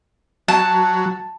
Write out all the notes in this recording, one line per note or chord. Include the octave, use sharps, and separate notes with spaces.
F#3 A5